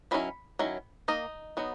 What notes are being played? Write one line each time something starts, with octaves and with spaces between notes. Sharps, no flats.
D#3 F#3 C#4 E4 B5
D#3 F#3 C#4 E4
D#3 A#3 D#4 D#5
F#3 B3 D#4